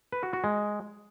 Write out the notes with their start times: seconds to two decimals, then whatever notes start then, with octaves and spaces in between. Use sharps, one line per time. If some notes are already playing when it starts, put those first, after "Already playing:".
0.12 B4
0.23 F#4
0.33 F#4
0.44 G#3